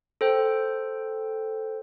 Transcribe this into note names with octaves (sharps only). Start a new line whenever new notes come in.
A4 C5 G5